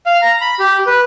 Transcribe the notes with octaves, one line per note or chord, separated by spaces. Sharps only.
F5
A#5
B5
G4
B4